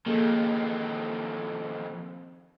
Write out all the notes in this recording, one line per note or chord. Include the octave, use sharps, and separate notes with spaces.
F2 D#3 A#3 G#4 A4